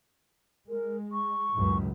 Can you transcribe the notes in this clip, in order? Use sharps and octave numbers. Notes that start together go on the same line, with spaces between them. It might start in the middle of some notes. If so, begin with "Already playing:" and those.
G#3 A#4
C#6
C#2 F#2 A2